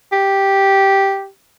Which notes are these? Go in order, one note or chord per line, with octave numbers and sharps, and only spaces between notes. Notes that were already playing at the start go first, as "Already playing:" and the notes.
G4